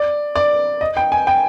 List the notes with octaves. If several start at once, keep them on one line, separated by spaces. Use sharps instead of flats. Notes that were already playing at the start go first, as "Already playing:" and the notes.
Already playing: D5
D5
D#5
G5
G#5
G5